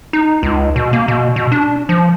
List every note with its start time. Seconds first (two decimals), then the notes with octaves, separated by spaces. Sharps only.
0.13 D#4
0.43 C#2
0.76 B2
0.93 A#3
1.08 B2
1.36 B2
1.52 D4
1.89 F3